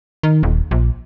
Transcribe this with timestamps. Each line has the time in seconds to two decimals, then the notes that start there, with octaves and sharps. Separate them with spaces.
0.23 D#3
0.43 D#1
0.71 A#1